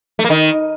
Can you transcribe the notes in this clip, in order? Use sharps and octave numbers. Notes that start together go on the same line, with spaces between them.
A3
A#3
D#3